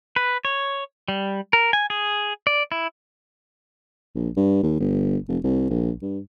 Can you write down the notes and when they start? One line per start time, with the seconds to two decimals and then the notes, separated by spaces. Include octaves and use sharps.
0.16 B4
0.45 C#5
1.08 G3
1.53 A#4
1.73 G#5
1.90 G#4
2.47 D5
2.72 E4
4.16 A#1
4.37 G2
4.63 D#2
4.80 G1
5.28 F1
5.44 C2
5.70 A#1
6.02 G2